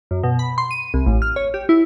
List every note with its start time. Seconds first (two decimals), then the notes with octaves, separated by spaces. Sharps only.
0.11 F#2
0.23 B2
0.39 B5
0.58 C6
0.71 D#7
0.94 C2
1.06 A1
1.22 F6
1.36 C#5
1.54 G4
1.69 E4